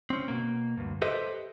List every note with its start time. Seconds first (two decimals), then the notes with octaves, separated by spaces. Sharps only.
0.10 C4 C#4
0.28 B2 A#3
0.77 D2 G2
1.02 G4 A4 B4 C5 D#5 E5